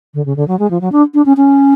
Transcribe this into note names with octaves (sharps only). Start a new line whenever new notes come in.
D3
C#3
D3
F#3
G#3
F3
F#3
D4
D4
C#4
C#4